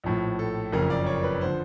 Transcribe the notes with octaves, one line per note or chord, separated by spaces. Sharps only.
A#1 A2 F3
A4
F#1 F2 C#3 A#4
D5
C#5
B4
D3 F3 C5